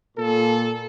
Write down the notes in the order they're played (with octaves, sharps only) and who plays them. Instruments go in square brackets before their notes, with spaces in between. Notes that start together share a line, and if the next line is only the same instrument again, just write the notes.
[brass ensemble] A#2 A4